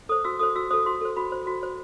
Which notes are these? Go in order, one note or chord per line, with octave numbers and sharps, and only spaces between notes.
A4 C5 D#6
F#4 E6
A4 C5 D#6
F#4 E6
A4 C5 D#6
F#4 C6
A4 C5
F#4 B5
C5
F#4
C5